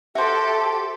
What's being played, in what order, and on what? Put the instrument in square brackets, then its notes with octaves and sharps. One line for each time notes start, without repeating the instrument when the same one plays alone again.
[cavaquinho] F#4 C5 [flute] G4 [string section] A4 [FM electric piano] E5